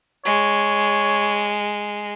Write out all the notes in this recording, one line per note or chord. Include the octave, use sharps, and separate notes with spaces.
G#3 C#5